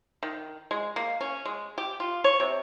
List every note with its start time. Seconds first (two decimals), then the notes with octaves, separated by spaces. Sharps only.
0.23 D#3
0.71 G#3
0.96 A#3
1.21 C#4
1.45 G#3
1.78 G4
2.00 F4
2.24 C#5
2.40 C3